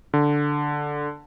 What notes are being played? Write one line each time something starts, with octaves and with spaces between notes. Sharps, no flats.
D3